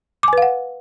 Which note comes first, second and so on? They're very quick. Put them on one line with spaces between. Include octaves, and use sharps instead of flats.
D6 G#5 B4 F5 F#5